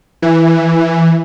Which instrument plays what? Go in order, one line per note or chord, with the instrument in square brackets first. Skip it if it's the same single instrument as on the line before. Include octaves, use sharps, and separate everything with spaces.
[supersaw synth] E3